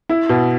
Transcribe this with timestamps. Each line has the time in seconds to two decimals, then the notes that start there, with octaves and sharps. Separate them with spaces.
0.09 E4
0.29 B2